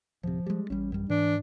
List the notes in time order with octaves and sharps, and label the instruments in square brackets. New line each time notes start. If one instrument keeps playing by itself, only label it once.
[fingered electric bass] D1 C3 [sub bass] F3
[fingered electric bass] G3 G#3
[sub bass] A1 [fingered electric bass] G3 C#4
[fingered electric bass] F#2 G3
[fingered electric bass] G#2 [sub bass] E3 [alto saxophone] D4